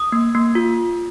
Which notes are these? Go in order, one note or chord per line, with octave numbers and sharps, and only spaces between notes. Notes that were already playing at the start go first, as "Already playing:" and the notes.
Already playing: D#6
A#3
A#3
F4